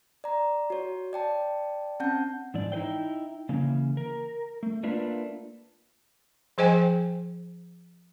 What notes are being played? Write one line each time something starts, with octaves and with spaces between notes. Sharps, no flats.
D5 A#5
F#4 C#5
D5 G5 A5
C4 C#4 F#5 A5 G6
G#2 E3 D5
D#4 E4 B4 C5 G5
C#3 E3 A#3 C#4
A#4
A3
A3 A#3 D4 F4 A#4 B4
F3 G#4 C5 D#5 G5 G#5